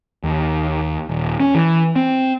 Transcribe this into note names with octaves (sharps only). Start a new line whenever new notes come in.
D#2
D#1
C#4
E3
C4